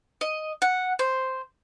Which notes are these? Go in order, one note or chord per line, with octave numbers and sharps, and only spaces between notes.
D#5
F#5
C5